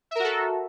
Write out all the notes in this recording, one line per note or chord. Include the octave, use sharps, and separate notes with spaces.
F#4 A4 A#4 E5